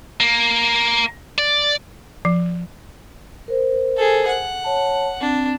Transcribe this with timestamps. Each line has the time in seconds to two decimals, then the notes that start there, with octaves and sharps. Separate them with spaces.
0.20 A#3
1.38 D5
2.25 F3
3.48 A#4 C5
3.96 G#4 A4
4.27 F#5
4.64 C#5 A5
5.21 C4 D4